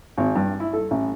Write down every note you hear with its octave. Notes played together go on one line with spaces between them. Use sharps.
G#1
G2
E4
A4
A1